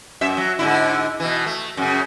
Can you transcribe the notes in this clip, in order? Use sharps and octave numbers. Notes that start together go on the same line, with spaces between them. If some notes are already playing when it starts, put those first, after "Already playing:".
F#2 E5
F#3
G#2 D3 E4
B2 E3
A3
F#2 C#3